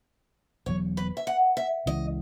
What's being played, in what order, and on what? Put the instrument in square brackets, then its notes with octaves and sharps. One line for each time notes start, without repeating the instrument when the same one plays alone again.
[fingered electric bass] E1 E2 D#3 F#3 [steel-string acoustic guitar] C#5
[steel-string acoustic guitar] B4
E5
F#5
E5
[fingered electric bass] C#2 C#3 E3 G#3 [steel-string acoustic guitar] D#5